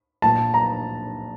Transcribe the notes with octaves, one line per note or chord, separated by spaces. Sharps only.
A#2 A5
A#5